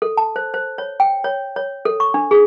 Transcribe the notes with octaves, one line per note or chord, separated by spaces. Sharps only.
A4
A5
C5
C5
C#5
G5
C#5
C#5
A4
C#6
D4
G#4